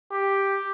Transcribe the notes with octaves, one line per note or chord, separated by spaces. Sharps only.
G4